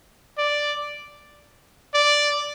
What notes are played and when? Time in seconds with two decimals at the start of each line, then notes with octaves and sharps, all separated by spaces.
0.38 D5
1.94 D5